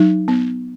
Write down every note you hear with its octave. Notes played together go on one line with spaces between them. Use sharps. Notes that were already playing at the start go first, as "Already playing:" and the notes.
Already playing: F#3 D#4
B3